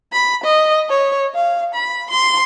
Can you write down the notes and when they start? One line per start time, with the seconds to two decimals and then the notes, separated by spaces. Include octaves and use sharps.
0.12 B5
0.44 D#5
0.89 C#5
1.35 F5
1.74 B5
2.10 C6